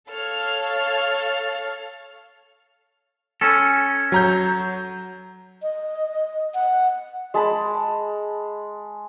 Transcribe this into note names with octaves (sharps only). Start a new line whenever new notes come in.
A4 C#5 F5 F6
C#4 A4
F#3 A#5 G6
D#5
F#5
G#3 A5 B5